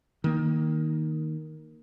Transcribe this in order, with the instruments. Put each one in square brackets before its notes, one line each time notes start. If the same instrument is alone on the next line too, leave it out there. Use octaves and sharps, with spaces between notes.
[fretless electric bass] D#3 A#3